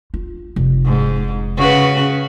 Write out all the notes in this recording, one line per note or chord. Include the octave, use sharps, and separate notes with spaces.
F4
F1
G#2
C#3 F#4 B4